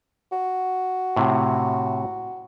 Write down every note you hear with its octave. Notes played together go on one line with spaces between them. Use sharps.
F#4
A2 C3